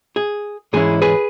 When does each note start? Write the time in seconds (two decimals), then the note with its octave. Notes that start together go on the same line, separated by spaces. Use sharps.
0.16 G#4
0.73 G#2 E3 G#3 C#4 E4 G#4
1.02 G#4 B4